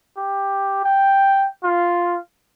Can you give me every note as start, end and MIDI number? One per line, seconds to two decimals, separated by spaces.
0.17 0.81 67
0.84 1.48 79
1.63 2.18 65